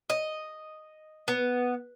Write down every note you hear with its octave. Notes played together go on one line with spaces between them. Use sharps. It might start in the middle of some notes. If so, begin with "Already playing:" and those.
D#5
B3